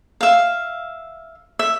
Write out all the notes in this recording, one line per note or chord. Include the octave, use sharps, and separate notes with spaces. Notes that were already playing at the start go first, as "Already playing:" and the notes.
E5 F5
E5